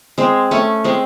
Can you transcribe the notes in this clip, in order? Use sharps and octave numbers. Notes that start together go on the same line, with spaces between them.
G#3 C4
A3 C#4
G#3 C4